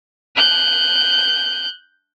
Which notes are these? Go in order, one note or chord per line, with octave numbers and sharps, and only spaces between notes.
F#6 G6